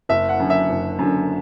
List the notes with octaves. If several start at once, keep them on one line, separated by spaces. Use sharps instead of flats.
F#1 E5
F#5
F#2 D3
E5
F#1
F#2 D3